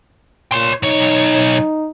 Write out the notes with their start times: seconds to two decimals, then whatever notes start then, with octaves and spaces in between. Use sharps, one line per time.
0.52 A#2 C#5 C6
0.83 B1 D#4 C#5